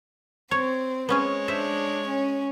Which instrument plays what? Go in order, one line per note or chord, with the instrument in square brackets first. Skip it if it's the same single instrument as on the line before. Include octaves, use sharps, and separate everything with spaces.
[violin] C4 [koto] C#5
[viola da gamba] G#3 C#5 [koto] B3 C#4 G#4
[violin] D4 [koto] C5 E5
[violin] C#4